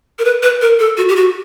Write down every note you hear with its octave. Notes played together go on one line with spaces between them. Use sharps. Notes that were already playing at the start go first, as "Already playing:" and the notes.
A#4
B4
B4
A#4
A4
F#4
G4
F#4